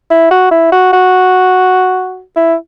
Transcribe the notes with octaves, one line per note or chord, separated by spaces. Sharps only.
E4
F#4
E4
F#4
F#4
E4